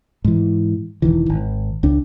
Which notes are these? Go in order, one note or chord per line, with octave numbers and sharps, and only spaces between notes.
G#2 E3
E1 E2 D#3 E3
G#1
C#2 D4